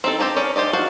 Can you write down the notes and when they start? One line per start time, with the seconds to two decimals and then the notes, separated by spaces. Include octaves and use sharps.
0.04 C4 D#4 A4
0.18 C4 G4 G#4 A5 A#5
0.36 C#4 A#4 D5
0.56 G4 C5 D5 D#5
0.73 F#4 F5 A5